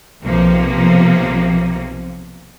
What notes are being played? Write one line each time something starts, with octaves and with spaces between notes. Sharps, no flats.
B1 C3 F3 A#3